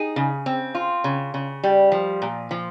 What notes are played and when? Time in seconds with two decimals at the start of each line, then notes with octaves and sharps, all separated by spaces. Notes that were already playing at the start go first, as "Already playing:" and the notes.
Already playing: D#4 G#4
0.16 C#3
0.46 C4
0.75 F4
1.04 C#3
1.34 C#3
1.64 G3
1.92 F3
2.22 A#2
2.51 F3